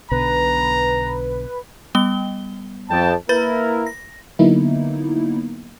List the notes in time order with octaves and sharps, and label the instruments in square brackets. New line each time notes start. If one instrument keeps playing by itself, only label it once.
[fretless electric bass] B1 B2 D3 [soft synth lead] B4 [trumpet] A#5
[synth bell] G3 B3 G7
[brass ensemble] F2 G5 A5
[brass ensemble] A#3 E4 A#4 [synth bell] B4 B5 A6
[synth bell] A#6
[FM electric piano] D3 F#3 A#3 B3 D#4 E4